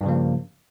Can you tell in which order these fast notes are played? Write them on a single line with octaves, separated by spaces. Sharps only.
G2 C#3 F3 A#3